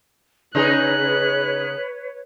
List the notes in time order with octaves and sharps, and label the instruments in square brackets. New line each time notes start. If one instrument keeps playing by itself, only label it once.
[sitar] C#3 D#4 G#4 [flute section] B4 C#5 [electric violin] F#6